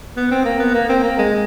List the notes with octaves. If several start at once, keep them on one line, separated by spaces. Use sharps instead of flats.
B3
C4
A#3
B3
A#3
C4
A#3
G#3